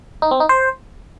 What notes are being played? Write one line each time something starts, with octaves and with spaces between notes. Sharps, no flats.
D#4
C4
D#4
C5